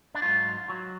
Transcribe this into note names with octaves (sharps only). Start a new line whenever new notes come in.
D4
G#2 F#3 F4
F#3